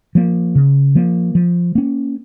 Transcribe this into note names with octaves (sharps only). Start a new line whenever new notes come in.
F3 A#3
C#3
F3 A#3
F3
A#3 C#4